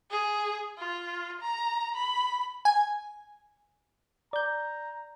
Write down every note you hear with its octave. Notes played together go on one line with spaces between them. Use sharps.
G#4
F4
A#5
B5
G#5
D5 A#5 G6